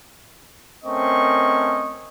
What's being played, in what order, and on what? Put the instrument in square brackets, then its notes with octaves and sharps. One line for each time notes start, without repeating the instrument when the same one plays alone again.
[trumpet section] A3 C4 C#4 A#4 D#5 C#6